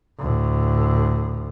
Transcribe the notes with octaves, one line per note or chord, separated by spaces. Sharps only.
D2 A2